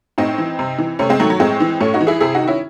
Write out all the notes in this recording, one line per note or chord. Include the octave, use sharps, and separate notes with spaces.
A2 C4 D#4
E3
C3
E3
C3 A3 C#4
G#3 C4
D#3 F#3 A3
F#3
A2 G#3 C4
E3
A2 A3 C#4
D#4 F#4
E3
E4 G#4
C3 E4 G#4
D#4 F#4
D#3
C#4 E4